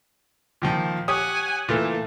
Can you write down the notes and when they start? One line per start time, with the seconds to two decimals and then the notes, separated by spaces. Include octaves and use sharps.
0.62 A#2 D#3 F3
1.08 G4 C#5 F#5 G#5 D#6
1.69 A#2 E3 A3 A4